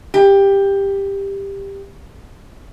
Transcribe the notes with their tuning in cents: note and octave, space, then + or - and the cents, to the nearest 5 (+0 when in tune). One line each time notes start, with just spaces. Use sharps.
G4 +10